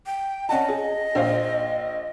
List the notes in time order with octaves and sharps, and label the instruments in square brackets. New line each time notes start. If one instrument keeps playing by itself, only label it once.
[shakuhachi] G5
[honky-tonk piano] C#4 F#5 A5 [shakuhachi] D#5
[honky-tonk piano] G#4
A#1 C5 F5